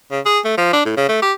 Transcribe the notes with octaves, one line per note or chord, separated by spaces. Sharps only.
C#3
G#4
A3
F3
D4
A2
C#3
A3
G4